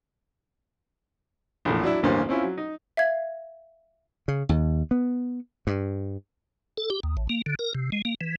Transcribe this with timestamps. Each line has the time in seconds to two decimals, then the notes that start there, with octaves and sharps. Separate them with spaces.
1.65 A#1 E2 A2
1.83 F#3 D4 E4
2.03 A1 D2 G2 A#3 C#4 C5
2.29 C4 C#4 E4 F4
2.43 F#3
2.57 D#4
2.97 E5 F5 G#6
4.28 C#3
4.49 D#2
4.91 B3
5.67 G2
6.78 A4
6.90 G4
7.03 D#2
7.17 A1
7.29 A#3
7.46 D3
7.59 A#4
7.75 C3
7.92 G#3
8.05 A#3
8.21 E3